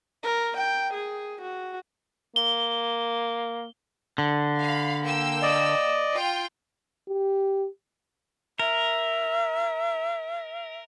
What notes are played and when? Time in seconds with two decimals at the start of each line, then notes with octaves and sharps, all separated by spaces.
0.23 A#4
0.57 G5
0.93 G#4
1.41 F#4
2.36 A#3 G7
4.18 D3
4.59 F5 B5
5.02 A#3 G5 E6
5.43 D5 D#5
6.14 F4 G5
7.08 G4
8.59 A#4 E5